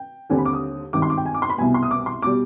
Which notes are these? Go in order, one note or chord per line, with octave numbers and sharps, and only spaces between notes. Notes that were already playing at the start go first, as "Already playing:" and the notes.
Already playing: G5
D#2 D3 G3 C4 G#5
B5
D6
D#6
G#1 G2 D#3 D6
C6
D6
G5
G#5
D6
C6
B5
C2 B2 B3 G#5
C6
D#6
D6
C6
B2 G3 D6